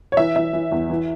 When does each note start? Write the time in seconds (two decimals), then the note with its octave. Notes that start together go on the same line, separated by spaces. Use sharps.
0.12 C#5
0.17 E3 E5
0.36 E3 E5
0.53 E3
0.72 E2
0.90 E3